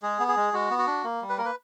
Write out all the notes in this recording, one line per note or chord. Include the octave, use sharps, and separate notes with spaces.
G#3 G#4
B3
G#4
G#3
G#3 F#4
B3
F#4
D4
A#3
G3
B4
A#3 A#4
B4